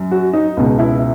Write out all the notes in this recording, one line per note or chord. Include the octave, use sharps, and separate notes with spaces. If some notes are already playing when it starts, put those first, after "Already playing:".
Already playing: F#2
F#4
D#4
C#2 B2
E4